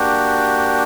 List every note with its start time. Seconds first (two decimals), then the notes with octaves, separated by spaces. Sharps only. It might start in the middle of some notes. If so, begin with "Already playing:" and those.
Already playing: A#3 D4 F#4 G4